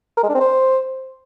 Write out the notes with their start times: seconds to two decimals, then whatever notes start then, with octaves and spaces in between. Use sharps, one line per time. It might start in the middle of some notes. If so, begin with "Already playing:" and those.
0.17 A#4
0.23 G#3
0.29 D4
0.35 C4
0.41 C5